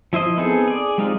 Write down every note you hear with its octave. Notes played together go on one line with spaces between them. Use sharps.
F3 E4 C5 D#5
B3 C4 D#4 G#4 A4
G#4 D5
G3 G#3 C4 D#4 F4